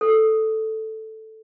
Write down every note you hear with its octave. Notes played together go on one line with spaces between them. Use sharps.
A4